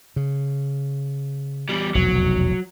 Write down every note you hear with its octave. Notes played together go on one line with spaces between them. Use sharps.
C#3
E2 G3
F1 B1 E2 F#3